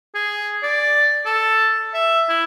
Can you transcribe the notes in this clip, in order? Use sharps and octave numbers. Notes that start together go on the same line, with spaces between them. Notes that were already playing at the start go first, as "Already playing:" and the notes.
G#4
D5
A4
E5
E4